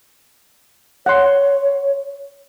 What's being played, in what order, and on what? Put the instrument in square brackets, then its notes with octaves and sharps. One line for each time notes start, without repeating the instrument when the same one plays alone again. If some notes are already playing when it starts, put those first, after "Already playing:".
[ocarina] C#5 [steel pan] F#5 C6